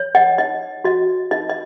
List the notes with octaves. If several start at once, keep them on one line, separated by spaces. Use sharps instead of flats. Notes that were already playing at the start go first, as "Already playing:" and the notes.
Already playing: C#5
D#5 F#5
D#4 D#5
F#4 D#5
D#4 D#5
D#5